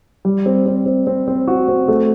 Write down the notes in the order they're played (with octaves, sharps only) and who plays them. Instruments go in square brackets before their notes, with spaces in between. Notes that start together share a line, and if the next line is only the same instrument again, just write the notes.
[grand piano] G3
C4
C4
C4
C4
C4
F#4
C4
A3